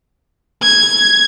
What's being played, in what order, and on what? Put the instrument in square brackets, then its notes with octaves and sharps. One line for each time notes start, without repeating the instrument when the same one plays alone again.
[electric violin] G#6